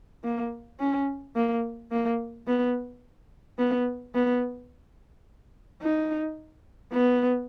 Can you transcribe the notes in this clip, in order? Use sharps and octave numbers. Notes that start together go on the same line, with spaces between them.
A#3
C#4
A#3
A#3
B3
B3
B3
D#4
B3